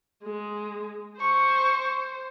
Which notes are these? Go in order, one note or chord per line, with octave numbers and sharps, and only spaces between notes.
G#3
C5 C#6